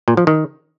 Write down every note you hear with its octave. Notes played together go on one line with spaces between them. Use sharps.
A#2
F3
D#3